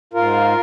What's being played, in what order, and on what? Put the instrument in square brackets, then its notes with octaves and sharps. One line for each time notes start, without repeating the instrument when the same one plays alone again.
[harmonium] G#2 F4 A#4